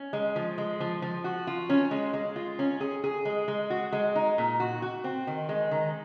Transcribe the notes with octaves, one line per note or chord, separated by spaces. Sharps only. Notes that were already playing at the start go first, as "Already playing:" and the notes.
Already playing: C#4
G#3
F3
G#3
F3
F3
F#4
F4
C#4
G#3
G#3
F4
C#4
G#4
G#4
G#3
G#3
F#4
G#3
D#4
A#2
F#4
F#4
C4
D#3
G#3
D#3